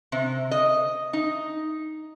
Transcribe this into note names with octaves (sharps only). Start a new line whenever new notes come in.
C3
D#5
D#4